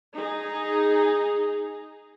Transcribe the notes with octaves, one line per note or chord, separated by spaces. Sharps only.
D#4 G#4